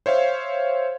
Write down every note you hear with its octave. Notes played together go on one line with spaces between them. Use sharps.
C5 C#5 E5 F5